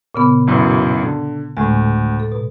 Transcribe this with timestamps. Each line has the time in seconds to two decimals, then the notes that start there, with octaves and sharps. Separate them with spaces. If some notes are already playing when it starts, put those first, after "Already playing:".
0.15 A#2 C#3 B3
0.47 B1 F#2 E3
1.03 D3
1.57 D2 A2 G#3
2.20 A4
2.32 B2